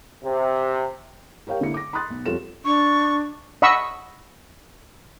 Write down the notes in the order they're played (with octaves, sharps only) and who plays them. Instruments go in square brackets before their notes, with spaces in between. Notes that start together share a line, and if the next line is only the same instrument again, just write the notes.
[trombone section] C3
[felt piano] G4 A#4 C#5 F5 G5
D3 A#3 E4 C#7
D6 A#6
B5 C6 D#6 F#6 A6
B1
F2 G3 F4 A4 C#5 E7
[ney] D4 [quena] C#6
[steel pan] D#5 F#5 B5 C#6 E6